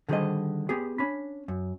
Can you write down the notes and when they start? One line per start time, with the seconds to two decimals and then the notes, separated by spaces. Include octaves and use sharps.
0.09 D3 D#3 G3 G#4 C5 D#5
0.69 B3 G4 G#4
0.98 C#4 D4 B5
1.48 F#2